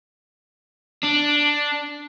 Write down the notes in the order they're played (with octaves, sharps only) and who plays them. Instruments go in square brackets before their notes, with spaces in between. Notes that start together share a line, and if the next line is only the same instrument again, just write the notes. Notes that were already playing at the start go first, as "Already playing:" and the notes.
[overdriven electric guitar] D4